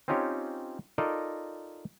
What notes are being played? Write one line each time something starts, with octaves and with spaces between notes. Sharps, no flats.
C4 C#4 D#4 F4 G4 C#5
D#4 F4 A4 A#4 D5 D#5